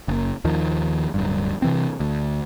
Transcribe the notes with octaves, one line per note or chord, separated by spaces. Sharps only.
F#1
D#2 D#3 F3
D1 G1 G2
C3 E3 C4
D2